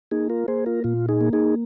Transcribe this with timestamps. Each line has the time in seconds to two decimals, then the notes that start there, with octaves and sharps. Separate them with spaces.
0.11 A#3 D#4 G#4
0.30 F4 A#4
0.48 A#3 G#4 C5
0.66 F4 A#4
0.84 A#2 F4
1.09 D#4 G#4
1.21 A#3
1.33 D#4 G#4